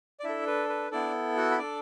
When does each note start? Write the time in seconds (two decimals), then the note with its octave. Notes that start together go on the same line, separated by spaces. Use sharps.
0.20 D5
0.24 D4 E4 A4 E5
0.47 B4
0.69 B4
0.91 B3 D4 E4 A4 D5
1.37 F#4 F#5
1.51 B5
1.58 D4 A4 D5 D6